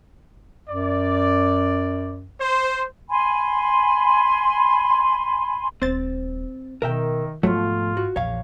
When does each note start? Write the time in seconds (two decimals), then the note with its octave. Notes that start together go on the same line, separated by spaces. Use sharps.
0.69 F#2 D5
2.41 C5
3.10 G#5 B5 C6
5.82 D#1 C4 C5 A6
6.82 B2 D#3 A#4 E5 G5
7.43 G#2 B2 F3 F#3 A3 F4
7.97 F#4
8.16 A#1 E2 C#5 F5